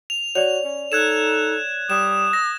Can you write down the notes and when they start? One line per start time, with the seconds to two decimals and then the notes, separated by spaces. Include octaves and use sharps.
0.10 F7
0.35 F#4 C#5 D5 F7
0.64 C#4
0.92 D#4 A4 F#6 G#6 E7
1.90 G3 D#6 E7
2.33 A#6